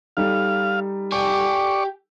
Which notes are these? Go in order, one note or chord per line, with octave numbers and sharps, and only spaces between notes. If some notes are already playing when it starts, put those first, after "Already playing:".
G3 D#4 A4 F5
G4 D5 G#5 C#6